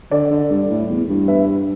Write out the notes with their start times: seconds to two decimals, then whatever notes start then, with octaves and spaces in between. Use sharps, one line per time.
0.11 D3 D5
0.31 D3
0.50 G2
0.70 A2
0.90 E2
1.09 G2
1.28 B4 E5